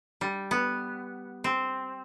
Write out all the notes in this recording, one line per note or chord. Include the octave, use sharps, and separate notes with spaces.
G3
B3
C4